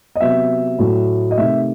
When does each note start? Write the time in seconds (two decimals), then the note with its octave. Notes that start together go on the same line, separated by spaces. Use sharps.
0.16 D#5
0.20 C3 F#3 B3 E5
0.79 A2 F#3 A3
1.31 D#5
1.38 C3 D#3 A3 E5